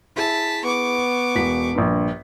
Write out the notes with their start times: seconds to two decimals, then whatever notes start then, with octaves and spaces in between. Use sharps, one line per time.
0.16 E4 G#4 A5 B6
0.64 B3 C#6 D6
1.35 E1 B6
1.75 A#1 G2